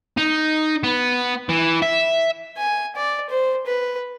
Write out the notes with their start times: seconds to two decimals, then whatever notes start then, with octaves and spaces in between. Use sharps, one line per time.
0.18 D#4
0.84 B3
1.49 E3
1.82 E5
2.57 G#5
2.96 D5
3.30 C5
3.66 B4